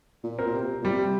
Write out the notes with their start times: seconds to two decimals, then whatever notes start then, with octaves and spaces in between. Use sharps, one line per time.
0.24 A#2
0.39 C4 A#4
0.46 A#2
0.54 C3
0.81 A#2
0.85 C3 G3